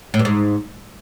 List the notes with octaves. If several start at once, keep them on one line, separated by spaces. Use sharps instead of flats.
A2
G2
G#2